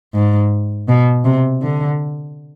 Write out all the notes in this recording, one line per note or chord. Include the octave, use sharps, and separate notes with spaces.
G#2
B2
C3
D3